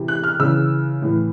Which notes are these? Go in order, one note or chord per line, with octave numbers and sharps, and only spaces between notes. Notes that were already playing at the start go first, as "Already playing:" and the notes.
Already playing: C3 E3
F#6
F6
C#3 E3 E6
A2 E3